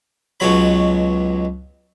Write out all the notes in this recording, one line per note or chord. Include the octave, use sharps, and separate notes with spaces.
C#2 B2 F#3 C#5 B5